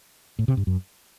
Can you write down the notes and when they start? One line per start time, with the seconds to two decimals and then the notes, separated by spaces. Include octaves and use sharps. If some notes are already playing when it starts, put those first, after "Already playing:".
0.39 A2
0.48 C3
0.57 G2
0.67 F#2